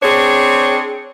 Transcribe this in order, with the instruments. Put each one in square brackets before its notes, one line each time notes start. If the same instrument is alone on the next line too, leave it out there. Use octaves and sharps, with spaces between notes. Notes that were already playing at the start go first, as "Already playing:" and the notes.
[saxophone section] C4 D4 G#4 C#5